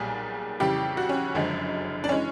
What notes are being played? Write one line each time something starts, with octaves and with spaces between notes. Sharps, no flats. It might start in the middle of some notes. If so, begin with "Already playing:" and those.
Already playing: B1 A#2 G3 G#4
F2 C#3 E3 G3 G4
F#4
C#4
F#1 F#2 D3 F3 G#3
D4
E3 G#3 C#4